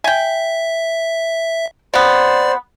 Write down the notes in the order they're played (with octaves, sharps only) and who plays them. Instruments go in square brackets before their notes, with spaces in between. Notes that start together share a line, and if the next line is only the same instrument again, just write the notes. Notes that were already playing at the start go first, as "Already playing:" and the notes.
[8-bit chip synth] E5 [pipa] G5 G#5
[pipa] C3 B3 [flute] C5 [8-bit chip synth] D5